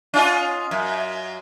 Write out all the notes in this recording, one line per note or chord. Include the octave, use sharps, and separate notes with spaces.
C#4 F4 D#5
F#2